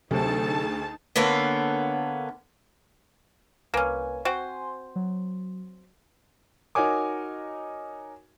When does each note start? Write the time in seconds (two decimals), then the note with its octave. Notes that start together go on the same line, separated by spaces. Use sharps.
0.11 D2 C3 F#3 D#4 G#4 A4 A5
1.16 D3 A#3 B3 C#4
3.74 C2 A#3 C#4 B4 G#5
4.25 C4 F#4 C5 G#5 C6
4.96 F#3
6.75 D#4 F#4 A#4 C#5 G#5 D6